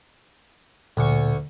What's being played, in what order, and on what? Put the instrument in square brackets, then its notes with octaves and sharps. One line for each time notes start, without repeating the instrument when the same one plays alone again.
[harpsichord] D2 C#6 [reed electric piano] A#2